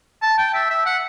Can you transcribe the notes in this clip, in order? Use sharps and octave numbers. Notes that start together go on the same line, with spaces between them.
A5
G5
E5
E5
F#5